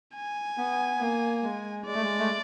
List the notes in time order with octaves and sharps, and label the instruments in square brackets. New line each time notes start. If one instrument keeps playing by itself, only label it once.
[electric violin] G#5
[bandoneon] B3
A#3
G#3
[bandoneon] G#3 [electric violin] D5
[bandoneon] A3
G#3
A3